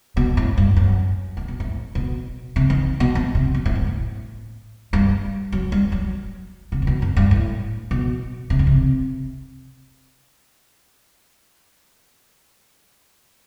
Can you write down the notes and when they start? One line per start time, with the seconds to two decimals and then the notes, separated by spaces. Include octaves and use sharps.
0.17 B2
0.37 A2
0.58 G2
0.76 F#2
1.37 A2
1.48 B2
1.60 A2
1.95 B2
2.56 C3
2.70 D#3
3.00 B2
3.15 A2
3.35 C3
3.54 B2
3.66 A2
3.75 G2
3.87 A2
4.93 G2
5.52 F#3
5.72 G3
5.92 F#3
6.72 C3
6.82 C3
6.87 B2
7.02 F#2
7.17 G2
7.31 A2
7.91 B2
8.50 C3
8.59 D#3
8.67 C3